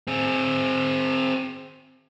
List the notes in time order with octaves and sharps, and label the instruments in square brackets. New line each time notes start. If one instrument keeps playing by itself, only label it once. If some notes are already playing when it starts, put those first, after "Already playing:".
[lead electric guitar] C4 G#4